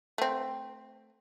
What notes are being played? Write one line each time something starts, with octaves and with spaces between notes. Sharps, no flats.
A3 C4